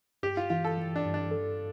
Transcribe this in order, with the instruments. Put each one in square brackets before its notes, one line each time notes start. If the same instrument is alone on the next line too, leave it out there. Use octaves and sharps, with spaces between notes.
[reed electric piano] G2 [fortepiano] G4
[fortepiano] F4
[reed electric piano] E3 [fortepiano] F4
[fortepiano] A4
[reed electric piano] E3
[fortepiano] D4
[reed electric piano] G2
[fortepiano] D4
[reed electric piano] A4